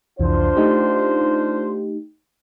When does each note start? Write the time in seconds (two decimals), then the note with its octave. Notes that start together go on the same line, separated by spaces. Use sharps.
0.20 C2 F2 E3 D4 F4 C5
0.57 A3 D#4 G4